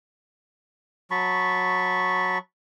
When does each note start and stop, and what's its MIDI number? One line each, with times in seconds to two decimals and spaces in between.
1.11 2.38 54
1.11 2.38 81
1.11 2.38 83
1.11 2.38 85